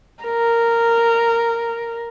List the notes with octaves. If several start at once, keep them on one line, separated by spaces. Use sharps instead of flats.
A#4